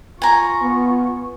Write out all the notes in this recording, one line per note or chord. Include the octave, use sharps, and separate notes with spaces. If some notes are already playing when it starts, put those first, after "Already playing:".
F4 G#5 A#5 C#6
B3